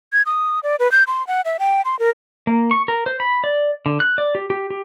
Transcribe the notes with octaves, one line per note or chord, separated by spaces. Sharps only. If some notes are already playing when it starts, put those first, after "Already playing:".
G#6
D#6
D5
B4
G6
C6
F#5
E5
G5
C6
A#4
A#3
C#6
A#4
C5
B5
D5
D3
F#6
D5
G4
G4
G4